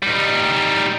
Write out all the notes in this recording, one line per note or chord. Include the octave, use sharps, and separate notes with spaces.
G3 D#4